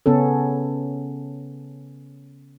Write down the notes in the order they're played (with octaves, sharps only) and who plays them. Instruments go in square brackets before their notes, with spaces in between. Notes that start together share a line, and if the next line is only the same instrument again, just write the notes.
[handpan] C#3 B3 C#4 A4